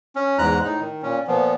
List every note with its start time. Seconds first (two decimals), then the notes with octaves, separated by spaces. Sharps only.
0.16 C#4
0.38 E2 G#2 G#3 A#5 F#6
0.64 A2 D#4
0.81 D#3
1.03 A#2 C#4
1.28 A#2 F3 B3